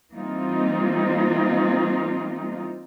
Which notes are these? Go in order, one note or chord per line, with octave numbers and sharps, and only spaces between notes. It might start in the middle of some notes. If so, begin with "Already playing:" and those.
E3 G3 A#3 C4 D#4 F4